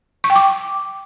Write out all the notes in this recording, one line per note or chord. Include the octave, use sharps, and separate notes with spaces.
C#6
G5
D6